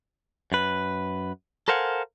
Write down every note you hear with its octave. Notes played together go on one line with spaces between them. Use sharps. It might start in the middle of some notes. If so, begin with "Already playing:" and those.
F#2 B4
A4 A#4 C5 F5 F#5 G#5